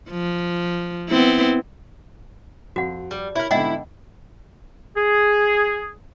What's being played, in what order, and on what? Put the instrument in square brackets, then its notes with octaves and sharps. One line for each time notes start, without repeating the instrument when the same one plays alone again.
[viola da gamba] F3
B3 C4 E4
[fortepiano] F2 [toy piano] F#4 F#5
[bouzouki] G3
[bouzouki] E4 A#4 [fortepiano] C#5
[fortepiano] G#2 B2 D3 [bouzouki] E4 [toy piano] D#5 F#5 G5
[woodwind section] G#4